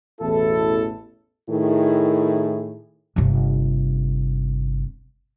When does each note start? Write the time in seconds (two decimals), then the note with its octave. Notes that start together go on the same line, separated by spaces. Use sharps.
0.21 A1 E2 B2 E4 A4
1.50 A2 D#3 E4 G#4
3.16 G1 C3